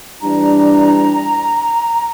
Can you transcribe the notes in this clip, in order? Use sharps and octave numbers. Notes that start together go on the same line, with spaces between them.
E3 G3 D4 A#5